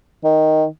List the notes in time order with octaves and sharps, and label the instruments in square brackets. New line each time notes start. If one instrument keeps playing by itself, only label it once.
[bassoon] D#3